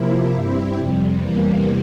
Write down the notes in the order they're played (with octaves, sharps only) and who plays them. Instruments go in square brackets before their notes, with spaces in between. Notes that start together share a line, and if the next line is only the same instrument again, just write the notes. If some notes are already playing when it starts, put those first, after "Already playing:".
Already playing: [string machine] C3 F3 A#3 E4
G2 G3 C4 E4
F2 C3 G3
E2 C3 E3 G3 A#3